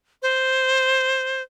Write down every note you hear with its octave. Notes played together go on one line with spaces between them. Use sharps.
C5